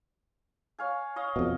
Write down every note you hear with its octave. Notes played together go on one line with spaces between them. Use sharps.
C#5 F5 G#5
C#5 D#5 F5
F2 B2